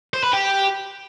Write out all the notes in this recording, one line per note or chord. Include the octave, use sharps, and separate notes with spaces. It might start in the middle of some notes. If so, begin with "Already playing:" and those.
C5
B4
G4